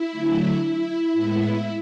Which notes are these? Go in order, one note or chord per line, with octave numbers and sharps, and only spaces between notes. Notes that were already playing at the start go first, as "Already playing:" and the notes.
Already playing: E4
D3 F#3 A3
E4
A2 G#3 B3